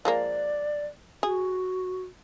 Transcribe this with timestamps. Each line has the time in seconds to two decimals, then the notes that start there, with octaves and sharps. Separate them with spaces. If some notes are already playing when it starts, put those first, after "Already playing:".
0.05 F3 G#3 A#3 D5
1.23 F#4 G#4